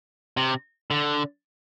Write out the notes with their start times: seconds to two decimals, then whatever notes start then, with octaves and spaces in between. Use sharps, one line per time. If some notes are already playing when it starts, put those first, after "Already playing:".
0.37 C3
0.91 D3